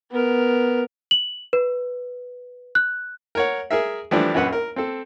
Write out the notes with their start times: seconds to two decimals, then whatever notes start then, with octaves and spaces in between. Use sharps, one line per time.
0.11 B3 A#4
1.11 F#7
1.53 B4
2.75 F#6
3.35 A#4 C#5 F#5
3.71 G#4 A#4 E5
4.11 E3 F3 G3 A3 D4
4.34 A#1 F#2 B4 F#5
4.52 A#4
4.76 C4 A4